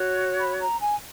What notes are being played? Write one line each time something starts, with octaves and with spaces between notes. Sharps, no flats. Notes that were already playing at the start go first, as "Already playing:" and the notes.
Already playing: F#4 C#5
B5
A#5
G#5